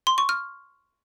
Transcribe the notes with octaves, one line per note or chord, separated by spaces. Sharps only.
C6
C#6
F6